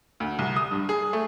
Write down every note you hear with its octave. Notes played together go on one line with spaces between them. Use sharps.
D2
C2
D#6
G2
G#4
A3